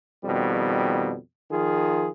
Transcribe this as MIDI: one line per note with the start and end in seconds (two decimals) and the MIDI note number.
0.24 1.16 41
0.24 1.16 47
0.24 1.16 51
0.24 1.16 55
1.50 2.09 51
1.50 2.09 53
1.50 2.09 65
1.50 2.09 68